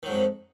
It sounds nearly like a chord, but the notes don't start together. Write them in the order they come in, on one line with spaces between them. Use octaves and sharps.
D#3 F#3 G#2 F2